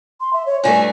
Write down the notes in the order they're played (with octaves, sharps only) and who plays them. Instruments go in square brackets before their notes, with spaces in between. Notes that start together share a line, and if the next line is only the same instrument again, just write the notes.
[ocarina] C6
E5
C#5
[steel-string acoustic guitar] G2 E3 A3 [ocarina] G#5